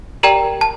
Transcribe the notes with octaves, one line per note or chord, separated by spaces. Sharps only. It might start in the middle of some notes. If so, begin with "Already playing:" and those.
G4 A#4 D5 G5 A#5
A5